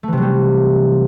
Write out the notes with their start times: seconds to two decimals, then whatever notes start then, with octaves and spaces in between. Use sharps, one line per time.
0.03 A3
0.08 E3
0.13 C3
0.17 F#3
0.22 G3